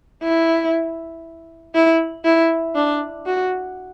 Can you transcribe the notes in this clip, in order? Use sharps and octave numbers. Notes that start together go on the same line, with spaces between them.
E4
E4
E4
D4
F#4